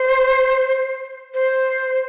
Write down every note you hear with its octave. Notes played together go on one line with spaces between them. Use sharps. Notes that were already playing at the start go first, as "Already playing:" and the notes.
Already playing: C5
C5